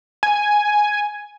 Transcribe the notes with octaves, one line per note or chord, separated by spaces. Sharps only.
G#5